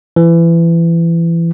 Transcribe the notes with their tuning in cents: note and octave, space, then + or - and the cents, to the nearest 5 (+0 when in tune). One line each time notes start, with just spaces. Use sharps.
E3 +25